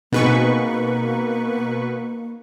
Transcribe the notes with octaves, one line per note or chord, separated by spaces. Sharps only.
B2 A#3 C4 D#4 G#4 B4 C#6